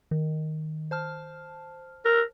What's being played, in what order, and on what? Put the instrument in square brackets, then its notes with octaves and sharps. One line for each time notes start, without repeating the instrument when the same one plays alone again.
[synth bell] D#3
C5 A5 F6
[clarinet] A#4